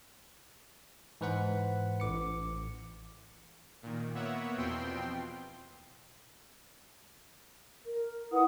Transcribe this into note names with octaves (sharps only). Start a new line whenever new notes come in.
G#2 E3 B4 C5 F#5 B5
A1 D6 C#7
A#2 D#3
A#3 B3 C#5 E5 F#5
E2 B2 F3 C4 G5 C6
A#4
E4 B4 F#5 D#6